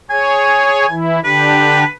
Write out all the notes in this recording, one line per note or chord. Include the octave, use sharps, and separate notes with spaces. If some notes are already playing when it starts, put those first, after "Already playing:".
G#4 C#5 G#5
E3 E4
D3 D4 G4 B4